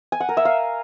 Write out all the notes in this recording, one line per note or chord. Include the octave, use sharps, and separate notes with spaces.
G#5
F#5
A#4
E5
F5